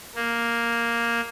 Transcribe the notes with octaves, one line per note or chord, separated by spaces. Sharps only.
A#3